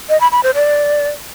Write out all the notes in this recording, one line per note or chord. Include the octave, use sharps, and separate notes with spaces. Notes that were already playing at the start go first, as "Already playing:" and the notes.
D#5
B5
B5
C5
D5